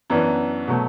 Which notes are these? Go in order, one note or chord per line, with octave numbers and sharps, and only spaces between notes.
F#2 E3 B3 D4
B2 F#3 A3